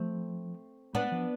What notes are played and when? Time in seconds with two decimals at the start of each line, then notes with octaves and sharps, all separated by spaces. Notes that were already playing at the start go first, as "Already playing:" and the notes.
Already playing: F3 A3 C4
0.94 G#3 B3 D4
1.12 F3